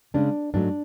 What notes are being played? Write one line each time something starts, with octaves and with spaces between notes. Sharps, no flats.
C#3 G#3 C#4 D4
G#2 F#3 A3 D4